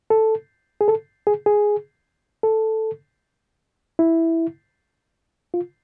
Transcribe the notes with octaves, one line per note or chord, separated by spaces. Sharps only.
A4
G#4
A4
G#4
G#4
A4
E4
F4